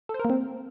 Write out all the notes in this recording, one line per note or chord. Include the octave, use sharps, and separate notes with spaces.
A4
C5
A#4
A#3
C4